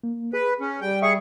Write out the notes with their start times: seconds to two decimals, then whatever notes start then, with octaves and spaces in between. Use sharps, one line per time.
0.04 A#3
0.33 G#4 B4
0.60 C#4
0.81 G3 G5
1.02 G#4 E5 C#6